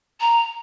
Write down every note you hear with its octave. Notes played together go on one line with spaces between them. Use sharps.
A#5